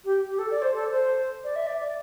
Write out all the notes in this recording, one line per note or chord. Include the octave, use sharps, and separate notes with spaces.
G4
G4
A4
D5
C5
A4
C5
D5
E5
D5
D5